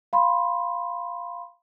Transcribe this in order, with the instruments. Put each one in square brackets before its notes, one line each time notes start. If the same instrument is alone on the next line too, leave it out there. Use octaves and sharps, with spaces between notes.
[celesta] F5 B5 C6